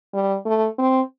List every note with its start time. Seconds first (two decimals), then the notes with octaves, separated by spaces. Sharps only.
0.14 G3
0.45 A3
0.78 C4